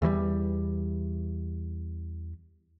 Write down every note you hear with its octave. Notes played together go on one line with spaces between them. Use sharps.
E2 E3 F#3 G3